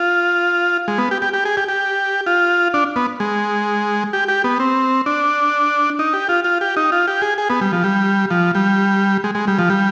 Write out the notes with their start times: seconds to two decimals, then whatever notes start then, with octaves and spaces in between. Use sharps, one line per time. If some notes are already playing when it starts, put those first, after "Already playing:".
Already playing: F4
0.88 G#3
0.98 B3
1.11 G4
1.22 G4
1.33 G4
1.45 G#4
1.57 G4
1.68 G4
2.26 F4
2.74 D4
2.96 B3
3.20 G#3
4.13 G4
4.28 G4
4.44 B3
4.60 C4
5.06 D4
5.99 D#4
6.14 G4
6.29 F4
6.44 F4
6.61 G4
6.77 D#4
6.92 F4
7.08 G4
7.22 G#4
7.38 G#4
7.50 B3
7.61 G3
7.73 F3
7.84 G3
8.31 F3
8.55 G3
9.24 G#3
9.35 G#3
9.47 G3
9.59 F3
9.70 G3